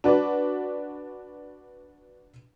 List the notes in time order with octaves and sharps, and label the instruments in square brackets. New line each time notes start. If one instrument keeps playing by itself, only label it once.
[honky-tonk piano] D4 F#4 B4 D5